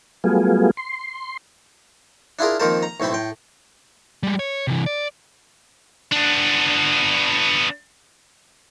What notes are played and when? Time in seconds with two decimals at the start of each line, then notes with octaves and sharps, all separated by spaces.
0.24 F#3 G3 A3 B3 F4 G#4
0.77 C6
2.39 D4 E4 F4 G#4 A#4
2.60 F2 D#3 A#3 A#4 C5 A5
2.83 A#5
3.00 B1 A2 C4 C5 B5
3.13 A2 G5
4.23 G3 G#3
4.39 C#5
4.67 C3 E3
4.86 D5
6.12 B3 D4